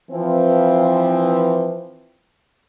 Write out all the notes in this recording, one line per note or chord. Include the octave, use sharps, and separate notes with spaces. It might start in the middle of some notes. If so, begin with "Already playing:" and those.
E3 F3 C4